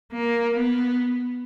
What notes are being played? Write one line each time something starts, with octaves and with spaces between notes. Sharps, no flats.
A#3
B3